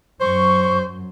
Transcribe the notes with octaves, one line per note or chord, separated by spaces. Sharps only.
F#2 F#3 C5 C#6